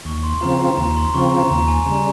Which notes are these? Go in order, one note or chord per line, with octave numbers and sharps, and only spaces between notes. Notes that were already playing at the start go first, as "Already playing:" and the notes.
D#2 C#6
C6
C#3 F3 C4 F4 A#5
A#5
D#2 A#5
C6
C#3 F3 C4 F4 C#6
A#5
D#2 A#5
G#5
C#3 G3 A#5